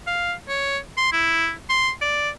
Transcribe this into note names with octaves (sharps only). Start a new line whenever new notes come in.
F5
C#5
C6
E4
C6
D5